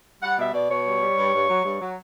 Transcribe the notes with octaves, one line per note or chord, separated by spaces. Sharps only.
G3 F#5
B2 E5
B2 D5
B2 C#5
G3
G3
G2
G2
F#3
G2
F#3